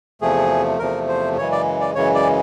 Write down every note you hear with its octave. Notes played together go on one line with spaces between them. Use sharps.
E2 C3 F3 A3 G#4
E2 C3 F3 A3 A#4
C5
F#2 C#3 E3 G#3 C#5
D5
D5
F#2 C#3 E3 G#3 C#5
D5